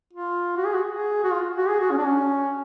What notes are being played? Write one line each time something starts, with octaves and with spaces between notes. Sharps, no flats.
F4
F#4
G#4
F#4
G#4
F#4
F4
F#4
G#4
F#4
C#4
D4
C#4